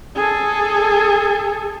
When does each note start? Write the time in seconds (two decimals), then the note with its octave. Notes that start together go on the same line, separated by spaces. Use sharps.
0.15 G#4 A4